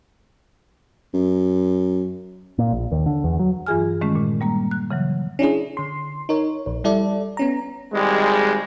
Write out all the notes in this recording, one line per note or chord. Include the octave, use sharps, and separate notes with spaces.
F#2
A#2
A#1
D#2
D3
E2
F#3
G2 E3 F4 G#4 G#5 F6
D#3 G#3 A3 C#4
A#2
G3 A#3 A#5
F#6
C#3 E3 F#3
C#4 D4 E4 G#4
D3 C6
D#4 A#4 C#5
A#1
G3 E4 A4 D5
B3 C#4 A#5
G#1 G3 G#3